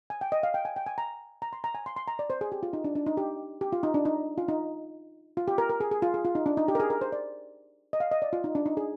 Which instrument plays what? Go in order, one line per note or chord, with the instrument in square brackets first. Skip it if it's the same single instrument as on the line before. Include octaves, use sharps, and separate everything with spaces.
[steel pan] G#5
G5
D#5
F5
G5
G#5
G5
G#5
A#5
A#5
C6
A#5
G#5
C6
C6
A#5
D5
C5
G#4
G4
F4
D#4
D4
D4
D#4
G4
G4
F4
D#4
D4
D#4
F4
D#4
F4
G4
A#4
A#4
G#4
G#4
F4
G#4
F4
D#4
D4
D#4
G4
A#4
G#4
A#4
C5
D5
D#5
F5
D#5
D5
F4
D#4
D4
D#4
G#4